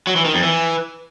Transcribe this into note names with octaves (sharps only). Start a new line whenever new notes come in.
F#3
E3
D#3
F2
E3